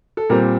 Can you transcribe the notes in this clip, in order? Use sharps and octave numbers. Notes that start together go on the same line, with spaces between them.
A4
A#2 G3 C4 A#4